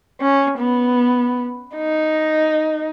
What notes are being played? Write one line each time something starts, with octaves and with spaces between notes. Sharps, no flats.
C#4
B3
D#4